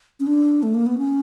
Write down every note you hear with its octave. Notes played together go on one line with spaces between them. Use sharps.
C#4
D4
A3
A#3
B3
C#4